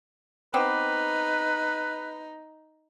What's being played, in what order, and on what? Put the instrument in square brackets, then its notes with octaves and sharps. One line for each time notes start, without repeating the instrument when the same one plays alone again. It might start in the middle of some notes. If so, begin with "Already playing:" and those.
[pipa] B3 C4 G4 [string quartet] D#4 [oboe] B4